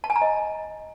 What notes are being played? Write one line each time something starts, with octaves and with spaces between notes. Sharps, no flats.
A5
G#5
A#5
D#5